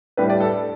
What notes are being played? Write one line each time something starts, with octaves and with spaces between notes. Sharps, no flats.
A2 G3 D4 B4
D5
A4